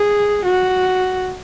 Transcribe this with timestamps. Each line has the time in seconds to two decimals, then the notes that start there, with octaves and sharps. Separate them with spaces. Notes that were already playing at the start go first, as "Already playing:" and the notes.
Already playing: G#4
0.45 F#4